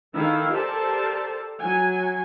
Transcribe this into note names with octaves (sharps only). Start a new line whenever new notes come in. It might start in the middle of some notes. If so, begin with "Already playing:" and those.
D#3 E4 A4 F5
G4 A4 A#4 C5 D5 A5
F#3 G#5